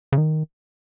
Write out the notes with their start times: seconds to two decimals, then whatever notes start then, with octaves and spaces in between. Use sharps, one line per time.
0.12 C#3
0.18 D#3